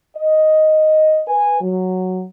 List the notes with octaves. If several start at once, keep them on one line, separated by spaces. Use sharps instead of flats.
D#5
B4 G#5
F#3